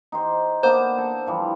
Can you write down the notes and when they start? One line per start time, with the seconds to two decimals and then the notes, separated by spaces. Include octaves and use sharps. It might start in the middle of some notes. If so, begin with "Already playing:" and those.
0.12 D#4 G4 C5
0.63 A#3 B3 D4 C5
0.98 A4
1.27 E3 F3 G3